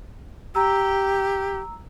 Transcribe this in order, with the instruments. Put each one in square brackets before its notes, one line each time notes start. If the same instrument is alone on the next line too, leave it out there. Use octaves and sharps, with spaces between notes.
[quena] G4 [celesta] A#5 E6